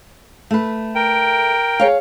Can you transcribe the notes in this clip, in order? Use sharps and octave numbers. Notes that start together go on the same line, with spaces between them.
A3 B4
A#4 G5
G#4 C#5 F5